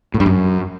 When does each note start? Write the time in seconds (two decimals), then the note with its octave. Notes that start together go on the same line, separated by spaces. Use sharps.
0.14 A2
0.20 G2
0.26 F#2